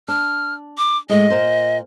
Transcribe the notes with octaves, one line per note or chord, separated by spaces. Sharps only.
D4 F6
D6
A2 G#3 D#5
A#2 A#4 C5